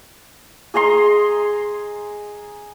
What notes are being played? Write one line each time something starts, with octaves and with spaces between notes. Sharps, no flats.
G#4 D#5 A#5 C6